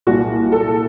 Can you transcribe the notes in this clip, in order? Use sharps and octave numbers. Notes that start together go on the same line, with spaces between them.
C2 A#2 F#4
A4